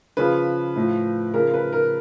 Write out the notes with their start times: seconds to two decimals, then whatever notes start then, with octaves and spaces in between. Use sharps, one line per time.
0.17 C#3 F3 B4
0.76 A2 F3
1.34 C#3 F3 A#4
1.54 B4
1.73 A#4